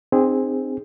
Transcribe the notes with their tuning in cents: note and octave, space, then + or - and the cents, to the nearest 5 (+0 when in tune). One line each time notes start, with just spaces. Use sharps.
C4 +0 D#4 -40 G#4 -20